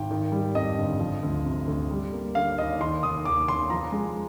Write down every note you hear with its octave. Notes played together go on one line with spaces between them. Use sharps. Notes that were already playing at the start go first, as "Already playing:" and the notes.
Already playing: G#1 G5
D#3
G3
F2 D#5
G1
F3
D2
C3
D2
G3
A#3
D3 F5
D#2 D#5
D#3 C6
F1 D#6
D#2 D6
F1 C6
F3 A#5
G#3